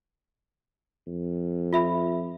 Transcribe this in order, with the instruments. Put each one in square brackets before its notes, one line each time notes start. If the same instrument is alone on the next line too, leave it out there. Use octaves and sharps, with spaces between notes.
[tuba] F2
[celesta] F4 E5 B5